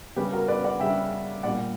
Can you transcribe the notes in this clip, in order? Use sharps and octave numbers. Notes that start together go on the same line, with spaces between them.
C#3 G3 G4 B4
F#4 A#4
B4 D5
D5 F#5
C#3 G3 E5 G5
A#2 G3 D5 F#5